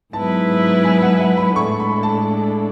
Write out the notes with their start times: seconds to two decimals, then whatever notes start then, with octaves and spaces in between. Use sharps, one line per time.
0.13 G#2 F#3 B3 E4 B4 A5
0.84 G#5
1.02 F#5
1.20 E5
1.37 B5
1.56 A2 G#3 D4 A4 C#6
1.80 B5
2.03 A5